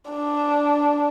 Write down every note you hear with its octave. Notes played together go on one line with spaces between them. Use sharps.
D4